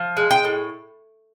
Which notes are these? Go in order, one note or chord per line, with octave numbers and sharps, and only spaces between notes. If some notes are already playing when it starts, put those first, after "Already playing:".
Already playing: F3
G#3
G5
A2